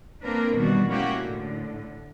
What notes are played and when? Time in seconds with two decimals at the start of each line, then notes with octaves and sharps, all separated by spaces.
0.22 A#3 C4 D4 A#4 B4
0.55 B2 D#3 E3 G3 D4 F#4
0.87 G#3 A#3 C#4 E4 F#4 G4
1.19 A2 D3